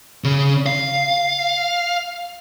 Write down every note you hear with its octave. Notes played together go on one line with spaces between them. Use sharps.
C#3
F5